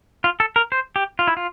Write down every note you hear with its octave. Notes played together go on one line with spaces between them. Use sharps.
F4
A4
A#4
C5
G4
F4
E4
F4